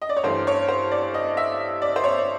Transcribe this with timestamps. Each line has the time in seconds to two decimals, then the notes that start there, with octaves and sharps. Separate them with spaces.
0.02 D#5
0.09 D5
0.16 C#5
0.23 G2 E3 A3 C5
0.47 C#5
0.68 C5
0.91 D5
1.14 D#5
1.37 E5
1.82 D5
1.96 C5
2.04 C#5